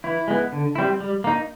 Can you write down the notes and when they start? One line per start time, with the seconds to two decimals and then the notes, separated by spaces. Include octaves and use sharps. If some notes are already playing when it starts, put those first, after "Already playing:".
0.04 E3 E4
0.28 G#3 B3 E4
0.52 D3
0.75 G3 C4 E4
1.00 G3
1.24 A#3 D#4